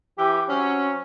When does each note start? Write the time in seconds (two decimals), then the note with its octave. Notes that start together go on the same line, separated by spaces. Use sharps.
0.18 E3 G4
0.49 F#3 C4 C#4